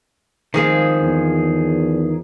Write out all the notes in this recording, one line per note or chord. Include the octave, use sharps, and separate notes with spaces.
D#3 F3 G#3 C4 G#4
E2